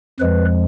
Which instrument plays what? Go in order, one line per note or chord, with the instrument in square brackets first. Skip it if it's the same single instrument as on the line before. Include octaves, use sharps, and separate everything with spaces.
[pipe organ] F2 F3 G#3 B4